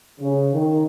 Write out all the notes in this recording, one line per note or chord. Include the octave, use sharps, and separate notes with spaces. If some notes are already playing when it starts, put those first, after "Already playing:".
C#3
D#3